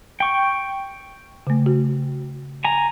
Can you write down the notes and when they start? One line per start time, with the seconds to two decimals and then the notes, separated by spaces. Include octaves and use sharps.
0.20 G5 C#6
1.47 C#3 A3
1.66 F#4
2.64 G#5 A#5